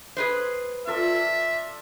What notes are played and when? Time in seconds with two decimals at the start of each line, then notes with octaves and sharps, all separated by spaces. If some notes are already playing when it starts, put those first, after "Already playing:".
0.17 G#4 B4 C5
0.87 F4 A4 D5 E5